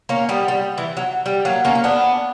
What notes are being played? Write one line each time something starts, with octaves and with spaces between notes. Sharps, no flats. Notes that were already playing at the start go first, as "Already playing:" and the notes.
A#3 C#4
G3 B3
G3
E3
F#3
G3
F#3 A#3
A#3 C#4
C#4
B3 D4